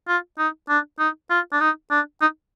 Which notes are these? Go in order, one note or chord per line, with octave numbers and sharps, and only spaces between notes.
F4
D#4
D4
D#4
F4
D4
D#4
D4
D#4